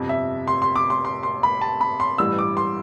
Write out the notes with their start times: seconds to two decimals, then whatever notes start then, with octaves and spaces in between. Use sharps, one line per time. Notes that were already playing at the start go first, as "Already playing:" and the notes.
Already playing: G1 F2 C3
0.09 E5
0.48 C6
0.62 C6
0.76 D6
0.90 C6
1.05 C6
1.23 C6
1.43 B5
1.61 A5
1.81 B5
2.00 C6
2.18 A1 G2 E3 G3 E6
2.39 D6
2.57 C6